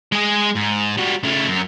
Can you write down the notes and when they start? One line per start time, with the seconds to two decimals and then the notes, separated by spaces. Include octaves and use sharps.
0.12 G#3 G#4
0.55 G#2
0.97 G3 F#4
1.23 C#3 A3
1.48 F#2